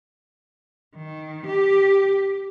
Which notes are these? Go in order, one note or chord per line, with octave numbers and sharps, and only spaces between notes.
D#3
G4